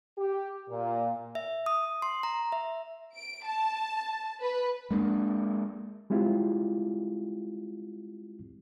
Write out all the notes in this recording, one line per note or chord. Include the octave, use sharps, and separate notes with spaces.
G4
A#2
E5
D#6
C6
A#5
E5
D7
A5
B4
G#3 A#3 B3 D4
G3 G#3 C4 E4 F4 G4